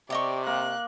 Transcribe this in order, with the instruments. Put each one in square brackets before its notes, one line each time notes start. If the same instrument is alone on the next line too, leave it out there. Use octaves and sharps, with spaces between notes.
[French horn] C3 [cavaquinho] G4 D#5 C#6 [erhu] D5
[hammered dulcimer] A#3 [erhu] F#6